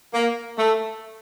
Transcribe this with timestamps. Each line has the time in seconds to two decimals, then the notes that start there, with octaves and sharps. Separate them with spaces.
0.14 A#3
0.58 A3